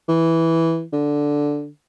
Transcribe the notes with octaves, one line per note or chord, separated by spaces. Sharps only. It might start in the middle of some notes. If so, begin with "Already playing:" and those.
E3
D3